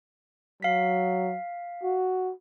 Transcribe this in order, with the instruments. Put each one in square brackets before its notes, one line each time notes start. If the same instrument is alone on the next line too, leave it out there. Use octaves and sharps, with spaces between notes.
[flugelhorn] F#3 [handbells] F5 B6
[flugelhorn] F#4